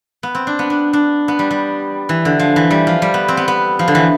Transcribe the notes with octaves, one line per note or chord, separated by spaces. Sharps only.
B3
C4
D4
B3
D4
D4
B3
G3
G3
E3
D3
F3
E3
G3
F3
G3
B3
C4
B3
B3
F3
D3
E3